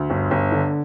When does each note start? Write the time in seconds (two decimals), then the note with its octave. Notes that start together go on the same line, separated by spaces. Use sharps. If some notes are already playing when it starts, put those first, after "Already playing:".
Already playing: D2
0.10 G1
0.31 G1
0.52 D3